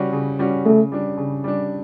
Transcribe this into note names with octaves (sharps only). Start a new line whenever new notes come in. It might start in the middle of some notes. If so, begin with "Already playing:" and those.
Already playing: C#3 G3 C#4 F#4
C#3
G3 C#4 F#4
C#3 A3
G3 D4
C#3
G3 D4